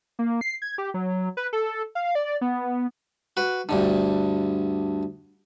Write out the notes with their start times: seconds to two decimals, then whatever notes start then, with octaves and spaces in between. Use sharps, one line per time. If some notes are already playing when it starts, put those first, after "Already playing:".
0.19 A#3
0.41 C7
0.62 G#6
0.78 G4
0.94 F#3
1.37 B4
1.53 A4
1.95 F5
2.15 D5
2.41 B3
3.37 F#4 B4
3.69 D2 G2 D3